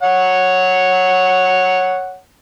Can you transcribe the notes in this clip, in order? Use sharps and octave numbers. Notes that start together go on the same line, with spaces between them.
C#5 F#5